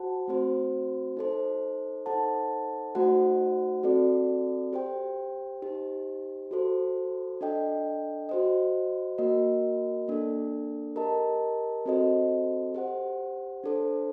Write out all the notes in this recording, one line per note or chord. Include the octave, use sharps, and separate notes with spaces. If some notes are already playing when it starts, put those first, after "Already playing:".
Already playing: F#4 C5 F#5 A5
A3 C4 F#4 C5
D#4 A4 C5
D#4 A4 C5 F#5 A5
A3 D#4 F#4 C5 F#5
C4 F#4 A4 D5
G4 C5 G5
D#4 G4 C5
F#4 A4 C5
D4 A4 D#5 G5
F#4 C5 D#5
A#3 F#4 A#4 D#5
A#3 D4 A4
G4 A#4 D#5 A5
C4 F#4 A4 C5 D#5
G4 C5 F#5
D4 A4 C5